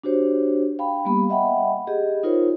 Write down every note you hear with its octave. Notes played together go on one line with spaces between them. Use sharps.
D4 F#4 G4 C5 C#5
F5 G5 B5
G3 A#3 B3 G4 B5
D#5 E5 F#5 G5 B5
G4 G#4 D#5
D#4 F4 A#4 C5 C#5